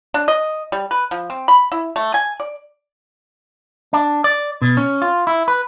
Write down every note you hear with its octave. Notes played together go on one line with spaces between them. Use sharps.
D4
D#5
G3
B4
F3
C4
B5
E4
A3
G#5
D5
D4
D5
B2
C#4
F4
E4
B4